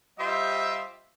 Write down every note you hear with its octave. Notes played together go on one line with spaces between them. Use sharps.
G3 F4 G4 C5 D#5 E5